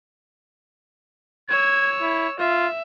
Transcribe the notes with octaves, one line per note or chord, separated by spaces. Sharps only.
C#5 E6 G#6
E4
F4 E5